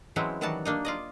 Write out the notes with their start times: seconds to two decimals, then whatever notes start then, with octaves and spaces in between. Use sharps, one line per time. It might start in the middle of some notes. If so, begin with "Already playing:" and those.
0.16 E3 F#3 G#3 C4 C#4 E4
0.41 D#3 E3 F#3 G3 F#4 A5
0.65 A#3 D4 D#4
0.85 F4 D5 D#5